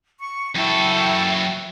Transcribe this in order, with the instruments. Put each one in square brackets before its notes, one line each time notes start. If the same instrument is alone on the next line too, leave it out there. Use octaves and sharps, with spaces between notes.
[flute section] C#6
[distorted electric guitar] F#2 A4 [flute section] E4 G5 C#6